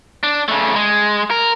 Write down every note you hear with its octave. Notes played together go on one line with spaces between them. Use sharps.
D4
C#3 A3
G#3
A#4